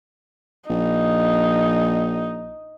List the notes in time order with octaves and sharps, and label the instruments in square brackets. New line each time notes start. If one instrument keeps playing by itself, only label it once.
[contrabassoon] A#1 [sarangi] D#4